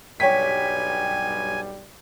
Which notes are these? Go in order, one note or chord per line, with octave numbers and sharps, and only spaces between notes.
B1 G2 G3 C#5 G5 G#5 B6